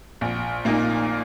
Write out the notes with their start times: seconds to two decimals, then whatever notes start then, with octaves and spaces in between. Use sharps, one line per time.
0.21 A#1
0.65 A#2 A#3 D#4